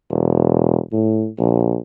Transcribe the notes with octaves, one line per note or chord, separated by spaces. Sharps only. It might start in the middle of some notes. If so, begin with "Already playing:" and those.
E1
A2
A#1